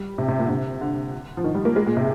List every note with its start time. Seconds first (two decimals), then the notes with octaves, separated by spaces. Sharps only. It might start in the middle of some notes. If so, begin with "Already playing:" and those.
Already playing: G3
0.18 C3
0.28 C3
0.39 A#2
0.45 D3
0.49 C3
0.81 D3
1.37 F3
1.44 D#3
1.55 G3
1.65 A#3
1.76 G#3
1.86 A#2
1.97 C3